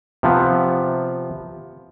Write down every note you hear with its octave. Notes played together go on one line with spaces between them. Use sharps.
C3 F3 B3